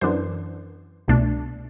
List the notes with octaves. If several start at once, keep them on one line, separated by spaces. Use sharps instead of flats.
F#2 E3 B3 D4 C5
C2 B2 A3 D4